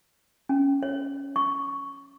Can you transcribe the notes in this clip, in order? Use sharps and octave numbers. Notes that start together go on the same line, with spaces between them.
C#4
C#5
C#6